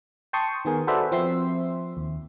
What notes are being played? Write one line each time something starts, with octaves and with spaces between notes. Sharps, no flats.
G5 A5 C6 C#6 D#6
D#3 B3 G#4 A#4
F#4 A4 B4 C5 D5 E5
F3 C4 E5 C6
D#2